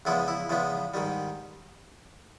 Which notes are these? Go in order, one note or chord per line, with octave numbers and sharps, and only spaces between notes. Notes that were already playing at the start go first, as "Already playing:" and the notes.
E2 C#3 F3 G#3 B3 E4
E4
E2 C#3 F3 G#3 B3
G#2 D#3 G3